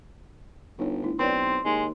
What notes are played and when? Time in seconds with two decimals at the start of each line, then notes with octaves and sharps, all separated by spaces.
0.79 G1 D#4 C#5
1.03 A3 D4 E4
1.19 B1 C4 B4 C#5 D5 C6
1.65 D#2 G#3